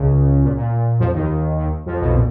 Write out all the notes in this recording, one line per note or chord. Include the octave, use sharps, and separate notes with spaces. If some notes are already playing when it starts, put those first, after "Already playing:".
Already playing: C#2 C#3
A#2
A#2
F2 F3
D#2 D#3
D#2 D#3
F2 F3
B1 B2
A#2